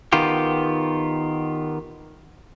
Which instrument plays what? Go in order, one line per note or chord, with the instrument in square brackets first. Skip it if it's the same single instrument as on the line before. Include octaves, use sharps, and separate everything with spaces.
[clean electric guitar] D#3 B3 F4 G4